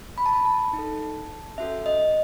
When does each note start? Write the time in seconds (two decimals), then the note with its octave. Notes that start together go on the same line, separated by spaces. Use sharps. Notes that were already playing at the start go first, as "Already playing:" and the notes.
0.18 B5
0.26 A5
0.33 B5
0.46 A5
0.73 D#4
0.79 A4
1.58 C#4 F#4 A4 E5
1.86 D#5